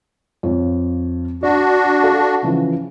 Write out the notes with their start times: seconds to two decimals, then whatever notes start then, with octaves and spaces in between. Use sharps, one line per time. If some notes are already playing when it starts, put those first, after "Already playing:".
0.43 F2 F4 C#5
1.43 D4 F#4 D5
2.03 A4 F5 A5
2.43 C#3 E3 F3